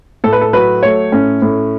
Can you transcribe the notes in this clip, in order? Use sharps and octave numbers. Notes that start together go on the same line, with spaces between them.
A2 A4
B4
A4
F#3 B4
A3 C#5
A2 C#4
A2